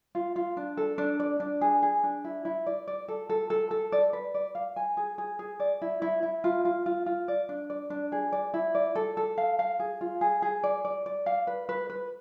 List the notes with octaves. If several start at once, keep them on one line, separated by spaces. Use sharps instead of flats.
F4
F4
D4
A4
D4
D5
D4
G#4
G#4
D4
E4
E4
D5
D5
A4
A4
A4
A4
D5
B4
D5
F5
G#5
G#4
G#4
G#4
D5
E4
E4
E4
F4
F4
F4
F4
D5
D4
D5
D4
G#4
D5
E4
D5
A4
A4
F5
F5
G#4
F4
G#4
G#4
D5
D5
D5
F5
B4
B4
B4